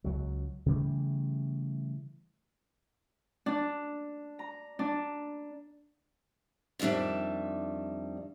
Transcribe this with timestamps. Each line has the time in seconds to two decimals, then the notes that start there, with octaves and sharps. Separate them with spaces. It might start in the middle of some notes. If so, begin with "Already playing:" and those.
0.04 C#2 F#3
0.66 C#3 E3 G3 A3
3.46 D4
4.39 A#5
4.79 D4
6.79 F2 D#3 G3 D4 E5